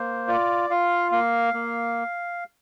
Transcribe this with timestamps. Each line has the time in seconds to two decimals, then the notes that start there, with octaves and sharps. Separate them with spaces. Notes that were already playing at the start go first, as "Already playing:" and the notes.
Already playing: A#3 C5
0.28 F4 D5
0.70 F4 F5
1.12 A#3 F5
1.54 A#3